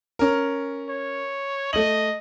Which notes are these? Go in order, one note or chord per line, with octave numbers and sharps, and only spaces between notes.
C#4 A#4
C#5
A3 D#5 F#7